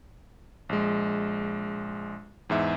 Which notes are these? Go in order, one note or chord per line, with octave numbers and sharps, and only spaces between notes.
A#1 G#3
E2 G#2 E5